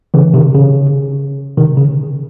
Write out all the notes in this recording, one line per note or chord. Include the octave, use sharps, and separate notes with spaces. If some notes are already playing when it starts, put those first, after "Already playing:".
C#3 E3
C3 D#3
C#3
C3 D#3
C#3